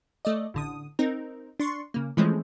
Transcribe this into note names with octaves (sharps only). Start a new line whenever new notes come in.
A3 D5 D#5
A1 D3 D#6
C4 D#4 A#4
D4 C6 C#6
C#3 A#3
E3 F3 G#3 A3 C4 C#4